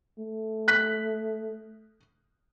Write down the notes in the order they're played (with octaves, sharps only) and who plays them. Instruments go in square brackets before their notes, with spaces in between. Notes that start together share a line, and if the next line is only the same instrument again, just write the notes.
[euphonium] A3
[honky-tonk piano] F#6 B6